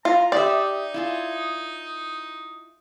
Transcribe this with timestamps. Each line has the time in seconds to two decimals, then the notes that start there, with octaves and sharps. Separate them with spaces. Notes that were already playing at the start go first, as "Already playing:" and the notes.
0.05 F4 A#5
0.32 D#4 G4 D5 E5
0.94 E4 F4 G#4